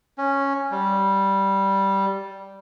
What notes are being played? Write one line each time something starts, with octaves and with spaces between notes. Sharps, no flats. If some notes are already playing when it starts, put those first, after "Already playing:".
C#4
G3